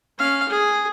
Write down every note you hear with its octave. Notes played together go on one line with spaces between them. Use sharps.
C#4 F5
G#4